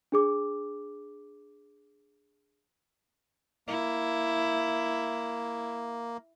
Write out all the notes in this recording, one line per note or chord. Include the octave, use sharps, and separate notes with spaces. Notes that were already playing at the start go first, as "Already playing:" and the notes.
D4 G#4 D6
A#3 E4